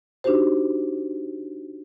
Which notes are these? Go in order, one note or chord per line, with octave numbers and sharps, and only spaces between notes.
D4 D#4 F#4 G4 C5